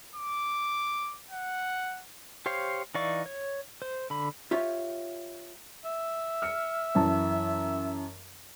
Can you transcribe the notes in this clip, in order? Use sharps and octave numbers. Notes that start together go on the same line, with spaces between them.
D6
F#5
G4 C5 C#5 F5
E3 D#4 D5 F5 C#6
C#5
C5
D3 B5
F4 G4 C#5 E5
E5
F6 C#7
F#2 E3 A5